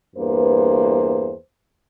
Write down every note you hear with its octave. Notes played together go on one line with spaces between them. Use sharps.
E2 G2 A#3 B4 C5